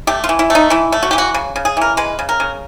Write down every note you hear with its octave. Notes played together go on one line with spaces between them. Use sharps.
A3 G4
F4
E3
E4
A3
D#4
E3 E4
A3
F#4
E3 G4
F#4
C#3
C#3
G#4
E3 A#4
G#3 B4
C#3
A#4
C#3